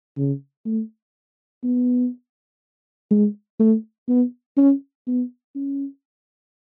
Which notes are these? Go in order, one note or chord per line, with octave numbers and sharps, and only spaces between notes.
C#3
A3
B3
G#3
A3
B3
C#4
B3
C#4